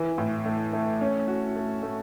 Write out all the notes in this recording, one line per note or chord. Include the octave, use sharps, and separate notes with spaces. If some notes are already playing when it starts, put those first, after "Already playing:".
Already playing: E3
A2
A3
A3
C#4
F#4
A3
A3